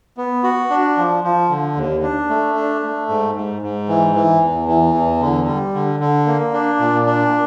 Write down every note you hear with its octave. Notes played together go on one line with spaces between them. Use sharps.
B3
F#4
D4
F3
F3
D3
D#2
D4
A3
D4
A3
G#2
G#2
G#2
E3
E3
E2
E3
E2
D3
G3
D3
D3
A#3
D4
A#2
D4